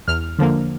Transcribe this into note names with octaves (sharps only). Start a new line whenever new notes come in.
E2 F6
D3 F3 A#3